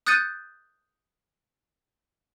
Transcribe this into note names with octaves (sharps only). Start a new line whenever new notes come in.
D#6 F#6 G6 A6 C#7 D#7